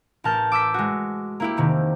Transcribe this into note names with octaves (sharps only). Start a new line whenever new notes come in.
A1 A#4 A5 F6 G6
D6 E6 G6 B6
G#3 F#4
A#3 E4 G4
F1 C3 D#3